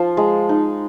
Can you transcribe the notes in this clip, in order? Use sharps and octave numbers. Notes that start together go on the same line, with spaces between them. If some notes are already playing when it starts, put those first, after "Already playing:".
Already playing: F3 F4
G#3
D#4